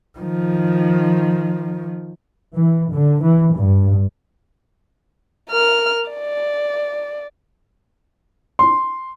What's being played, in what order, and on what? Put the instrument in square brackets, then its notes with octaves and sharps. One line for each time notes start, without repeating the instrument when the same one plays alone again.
[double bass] D#3 F3
[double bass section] E3
D3
E3
G2
[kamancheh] A#4 F6
D5
[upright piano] C6